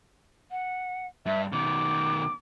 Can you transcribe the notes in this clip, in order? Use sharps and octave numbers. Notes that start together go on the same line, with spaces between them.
F#5
G2 E5
B2 D#3 D6